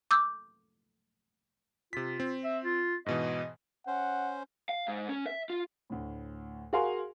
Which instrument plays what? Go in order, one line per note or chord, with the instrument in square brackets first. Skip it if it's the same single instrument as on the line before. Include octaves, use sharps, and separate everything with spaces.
[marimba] D6 E6 G6
[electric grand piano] C3 B6 [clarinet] F4
[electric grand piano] C4
[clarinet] E5
F4
[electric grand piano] G#2 B2 E3 [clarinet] D#5
[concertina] C#4 C5 [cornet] F#5
[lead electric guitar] F5
G#2
C#4
E5
F4
[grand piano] D2 A2
F#4 G#4 A#4 F5 G#5 C6